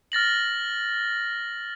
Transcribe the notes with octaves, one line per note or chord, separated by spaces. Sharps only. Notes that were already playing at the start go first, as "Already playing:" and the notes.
F6 A6 A#6 F#7